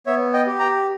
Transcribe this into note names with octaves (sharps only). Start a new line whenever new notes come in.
B3 C#5 E5
D#5 G5
G4
G5 A#5